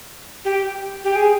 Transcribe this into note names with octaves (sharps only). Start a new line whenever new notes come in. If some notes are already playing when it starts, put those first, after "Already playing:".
G4
G4
G#4